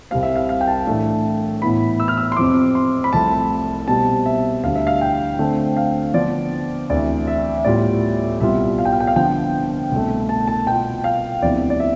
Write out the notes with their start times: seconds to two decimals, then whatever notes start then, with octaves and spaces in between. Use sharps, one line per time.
0.11 C2 C3 G3 C4 F5
0.23 E5
0.36 F5
0.49 F5
0.61 G5
0.67 A5
0.86 A2 E3 A3 D4
1.62 A2 E3 B3 E4 B5
2.00 E6
2.08 F6
2.17 E6
2.32 C6
2.37 F2 C3 F3 C4 D6
2.75 C6
3.04 B5
3.13 C2 C3 F3 A3 A5
3.88 B2 G3 C4 A5
4.26 E5
4.63 D2 D3 G3 F5
4.75 E5
4.87 F5
5.01 G5
5.39 D3 A3 C4
5.77 F5
6.14 D3 F3 B3 D5
6.90 D2 C3 E3 D5
7.27 E5
7.58 E5
7.65 A2 G3 B3 F4 D5
8.40 C2 B2 G3 B3 F4 E5
8.79 F5
8.85 G5
8.92 F5
9.00 G5
9.07 F5
9.16 D3 F3 B3 G5
9.91 C2 B2 A3
10.29 A5
10.48 A5
10.67 B2 B3 F4 G5
11.04 F5
11.42 D2 C3 F3 B3 E4 D5
11.70 D5
11.80 E5